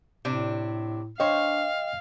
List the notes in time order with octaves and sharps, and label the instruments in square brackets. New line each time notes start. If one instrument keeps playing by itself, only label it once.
[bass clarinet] A2 [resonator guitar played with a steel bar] C3 D4
[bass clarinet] D4 [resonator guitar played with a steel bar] C5 C#5 [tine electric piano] D#5 G5 [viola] F5